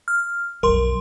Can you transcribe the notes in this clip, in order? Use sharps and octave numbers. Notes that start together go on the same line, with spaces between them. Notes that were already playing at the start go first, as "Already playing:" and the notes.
F6
B1 F2 A#4 C6